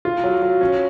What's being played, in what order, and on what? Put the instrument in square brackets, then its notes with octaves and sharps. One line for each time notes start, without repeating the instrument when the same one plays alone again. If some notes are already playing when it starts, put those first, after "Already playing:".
[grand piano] F4
F#3
F#3
C#4